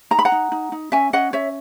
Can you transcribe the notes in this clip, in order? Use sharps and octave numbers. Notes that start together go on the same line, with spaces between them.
D#4 A#5
B5
F#5 A#5
D#4
D#4
D#4
C#4 E5 G#5
C#4 D#5 F#5
C#4 C#5 E5